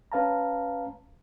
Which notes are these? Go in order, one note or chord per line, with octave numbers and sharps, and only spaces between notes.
C#4 B4 F5 A5 A#5